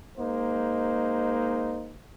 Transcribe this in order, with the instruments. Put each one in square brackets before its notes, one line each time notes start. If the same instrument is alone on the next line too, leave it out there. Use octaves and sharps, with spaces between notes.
[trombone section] G#3 A#3 D#4 C5